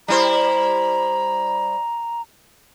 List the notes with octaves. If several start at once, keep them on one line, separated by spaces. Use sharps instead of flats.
G3 E4 C5 A#5